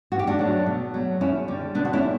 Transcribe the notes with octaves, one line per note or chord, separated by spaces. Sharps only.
G2 F#4
G4
D4 F#4
F#3 A3
B2
F#3 A3
F#2 C#4 E4
D3 G3
B2 B3 D4
F#4
C#4 E4
G3